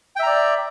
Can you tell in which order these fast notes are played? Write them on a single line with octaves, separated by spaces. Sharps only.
G5 E5 A#5 D5